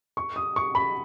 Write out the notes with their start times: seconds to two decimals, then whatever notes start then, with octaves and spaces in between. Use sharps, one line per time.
0.17 C#6
0.36 D#6
0.56 C#6
0.75 B5